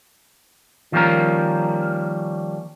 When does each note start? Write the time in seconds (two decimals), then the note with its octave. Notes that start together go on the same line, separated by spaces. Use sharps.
0.92 D#3 F3 G3 A#3 C#4 A#4